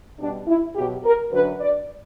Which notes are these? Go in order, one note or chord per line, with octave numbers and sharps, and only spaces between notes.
B2 G3 D4
E4
B2 F#3 G4
A#4
F#2 D3 F#3 B4
D5